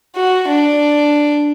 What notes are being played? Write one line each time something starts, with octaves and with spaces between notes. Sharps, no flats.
F#4
D4